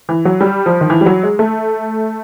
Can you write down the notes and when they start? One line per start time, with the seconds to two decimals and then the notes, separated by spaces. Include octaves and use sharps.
0.09 E3
0.25 F#3
0.41 G3
0.66 F3
0.81 D#3
0.90 E3
1.01 G3
1.06 F#3
1.23 G#3
1.39 A3